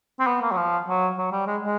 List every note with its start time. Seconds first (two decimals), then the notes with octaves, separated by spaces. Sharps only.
0.19 C4
0.27 B3
0.42 A#3
0.52 F#3
0.57 F3
0.88 F#3
1.18 F#3
1.32 G3
1.47 G#3
1.62 G#3